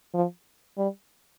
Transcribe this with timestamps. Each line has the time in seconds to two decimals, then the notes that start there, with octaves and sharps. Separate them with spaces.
0.14 F3
0.78 G3